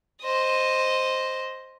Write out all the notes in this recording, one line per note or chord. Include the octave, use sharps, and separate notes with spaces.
C5 D#5